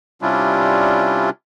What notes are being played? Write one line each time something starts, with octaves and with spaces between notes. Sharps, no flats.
C3 G3 C#4 D4 E4 F4